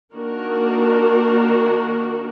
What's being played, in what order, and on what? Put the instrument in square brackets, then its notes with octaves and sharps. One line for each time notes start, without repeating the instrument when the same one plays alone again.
[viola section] D#3 A#3 D4 F#4 A#4